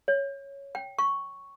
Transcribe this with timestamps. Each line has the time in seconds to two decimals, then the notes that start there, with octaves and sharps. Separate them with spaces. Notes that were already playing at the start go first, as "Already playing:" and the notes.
0.08 C#5
0.75 G5
0.99 C#6